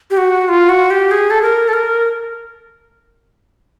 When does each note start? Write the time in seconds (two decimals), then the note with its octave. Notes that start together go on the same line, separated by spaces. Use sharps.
0.10 G4
0.17 F#4
0.49 F4
0.69 F#4
0.90 G4
1.11 G#4
1.30 A4
1.42 A#4
1.68 A4
1.73 A#4